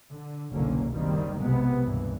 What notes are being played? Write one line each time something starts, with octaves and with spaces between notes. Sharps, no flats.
D3
F#1 C2 B2 D3 A#3 C#4
F#1 D#3 G3 A#3 C4
B1 C3 G#3 B3
C#2 G2 A#2 E3